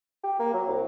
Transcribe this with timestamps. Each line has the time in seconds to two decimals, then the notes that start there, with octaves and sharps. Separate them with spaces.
0.24 G4
0.39 A#3
0.54 F#3
0.67 C2